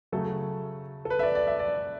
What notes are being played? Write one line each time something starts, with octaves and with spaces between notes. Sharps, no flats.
C#3 F#3 A3 A4
A4
B4
E5
D5
D5
E5
D5